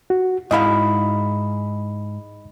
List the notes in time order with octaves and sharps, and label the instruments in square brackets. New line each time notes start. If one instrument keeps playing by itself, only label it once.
[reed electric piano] F#4
[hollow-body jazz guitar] G#2 E4 F5 [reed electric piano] D#5 B5